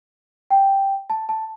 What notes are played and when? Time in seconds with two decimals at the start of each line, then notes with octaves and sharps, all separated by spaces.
0.50 G5
1.10 A5
1.29 A5